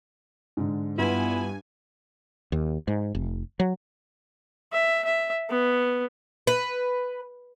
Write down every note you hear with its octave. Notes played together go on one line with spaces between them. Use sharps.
G#2 D3
G2 B3 E4 F4 G#5
D#2
G#2
F1
F#3
E5
E5
B3
B4